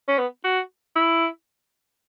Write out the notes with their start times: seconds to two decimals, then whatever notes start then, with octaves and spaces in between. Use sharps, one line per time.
0.08 C#4
0.18 B3
0.44 F#4
0.96 E4